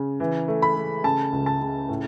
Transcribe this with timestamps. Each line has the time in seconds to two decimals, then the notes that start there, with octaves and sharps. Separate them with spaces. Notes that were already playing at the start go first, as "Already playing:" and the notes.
Already playing: C#3
0.20 E3
0.48 A3
0.62 B5
0.76 A3
1.04 C#3 A5
1.33 C#2
1.46 A5
1.61 C#3
1.89 A2